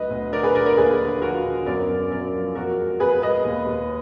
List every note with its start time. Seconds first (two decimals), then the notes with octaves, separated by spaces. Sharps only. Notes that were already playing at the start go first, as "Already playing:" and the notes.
Already playing: D2 F#3 B4 D#5
0.10 D2
0.32 D3 A#4 D5
0.43 G#4 B4
0.55 D3 A#4 D5
0.66 A#4 D5
0.77 D#2 G#4 B4
1.00 D3
1.22 F3 F#4 A#4
1.44 D3
1.66 F#2 A#4 D5
1.88 F#2
2.10 F#2 A#4 D5
2.34 F3
2.55 F2 F#4 A#4
2.79 G#3
3.00 F2 G#4 B4
3.22 G#3 B4 D#5
3.45 D#2
3.67 D#2